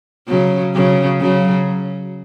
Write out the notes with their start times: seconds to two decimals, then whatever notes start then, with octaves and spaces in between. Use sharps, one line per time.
0.28 C#3 F#3
0.75 C#3 F#3
1.21 C#3 F#3